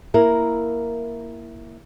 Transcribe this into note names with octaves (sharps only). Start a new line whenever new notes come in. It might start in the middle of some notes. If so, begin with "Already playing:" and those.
A#3 E4 A#4